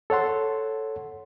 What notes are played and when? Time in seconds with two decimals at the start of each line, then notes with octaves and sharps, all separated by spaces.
0.10 A4 C#5 F#5 C6